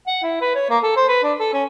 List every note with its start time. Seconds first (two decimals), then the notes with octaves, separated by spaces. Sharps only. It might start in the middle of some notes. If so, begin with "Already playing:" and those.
0.07 F#5
0.23 E4
0.41 B4
0.55 C#5
0.70 A#3
0.83 A4
0.96 C5
1.09 B4
1.23 D4
1.40 A4
1.54 C#4